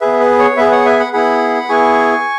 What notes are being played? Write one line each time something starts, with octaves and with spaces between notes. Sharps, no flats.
B3 G#4 B4 E5
B4
C#5
B3 G#4 B4 E5
C#5 F#5
E5 G#5
F#5 B5
B3 E4 G#4 F#5 B5
B3 E4 G#4 G#5 C#6